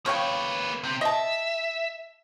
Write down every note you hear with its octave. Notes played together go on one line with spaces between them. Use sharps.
C#3 A#3 B4 C#5 G5
C3 C4
D#5 E5 A5